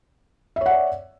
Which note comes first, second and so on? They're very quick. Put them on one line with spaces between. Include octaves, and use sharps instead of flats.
E5 C#5 F#5 D5